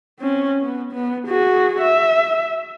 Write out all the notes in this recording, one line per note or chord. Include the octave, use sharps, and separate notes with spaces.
C4 C#4
B3
B3
F#4 G#4
E5